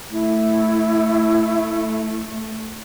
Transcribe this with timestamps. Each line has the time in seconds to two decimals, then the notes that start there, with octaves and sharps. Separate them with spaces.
0.12 A3 E4